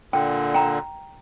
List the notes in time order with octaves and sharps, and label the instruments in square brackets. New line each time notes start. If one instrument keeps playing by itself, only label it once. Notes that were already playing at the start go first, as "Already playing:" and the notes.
[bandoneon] A#2 D3 [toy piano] G5
[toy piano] G5 A#5